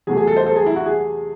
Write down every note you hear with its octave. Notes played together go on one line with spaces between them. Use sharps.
E2 C3 F#3 A3 G#4
G#4
A4
C5
A4
G#4
E4
F#4
G#4